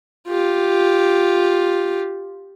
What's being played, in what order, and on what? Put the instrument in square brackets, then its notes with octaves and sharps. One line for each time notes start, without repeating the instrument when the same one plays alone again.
[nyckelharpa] F4 G4